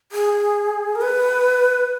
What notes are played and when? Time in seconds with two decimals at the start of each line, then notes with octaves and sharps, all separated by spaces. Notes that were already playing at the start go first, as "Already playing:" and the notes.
0.12 G#4
0.95 A#4
1.01 B4